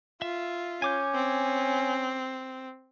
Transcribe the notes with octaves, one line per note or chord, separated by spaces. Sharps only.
F4 E5
C#4 G#5 D6 G6
C4